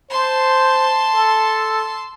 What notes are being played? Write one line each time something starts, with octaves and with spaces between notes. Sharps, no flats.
C5 A5 C6
A4